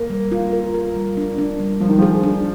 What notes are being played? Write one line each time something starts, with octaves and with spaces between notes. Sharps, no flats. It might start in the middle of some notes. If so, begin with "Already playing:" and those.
Already playing: A#3
G3
F4
A#4
A#4
G3
D4
D4
G3
F3 G3
D#3
F3 G#4
D4